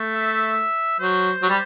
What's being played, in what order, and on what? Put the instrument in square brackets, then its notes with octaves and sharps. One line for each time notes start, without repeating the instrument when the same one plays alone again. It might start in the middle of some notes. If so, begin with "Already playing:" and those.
Already playing: [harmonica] A3
[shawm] E5
[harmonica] F#3 [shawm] C5
[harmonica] F#3
G3